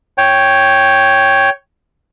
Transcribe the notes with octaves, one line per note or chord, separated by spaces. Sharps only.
C#5 G5